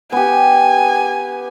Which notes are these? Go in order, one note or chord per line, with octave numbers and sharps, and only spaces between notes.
B3 G4 G#5